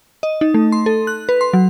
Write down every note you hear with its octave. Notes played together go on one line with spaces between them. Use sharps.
D#5
D#4
A3
C6
A4
F#6
B4
C6
F#3